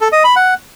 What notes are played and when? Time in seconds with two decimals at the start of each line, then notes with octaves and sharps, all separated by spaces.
0.01 A4
0.12 D#5
0.24 B5
0.36 F#5